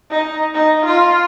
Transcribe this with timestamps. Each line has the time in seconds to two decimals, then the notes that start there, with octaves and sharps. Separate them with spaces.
0.11 D#4
0.55 D#4
0.85 F4